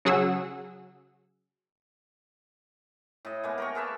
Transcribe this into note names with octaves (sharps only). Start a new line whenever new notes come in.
C#3 F#3 G#4 F#5 E6
A2 D#5
G#3 A#3 B3
A#4 G5 C#6
G#4 B4 E5 A5